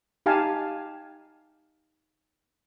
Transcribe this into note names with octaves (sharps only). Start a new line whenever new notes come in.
D#4 G4 F5 G#5 A5